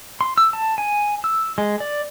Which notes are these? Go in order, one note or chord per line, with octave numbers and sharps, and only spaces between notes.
C6
E6
A5
G#5
E6
G#3
D5